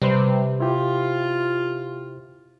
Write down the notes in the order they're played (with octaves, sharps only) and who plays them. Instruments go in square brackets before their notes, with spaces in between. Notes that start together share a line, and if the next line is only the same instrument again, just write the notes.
[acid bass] C3 [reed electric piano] G3 B4 C5
[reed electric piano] E4 G4 [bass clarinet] F4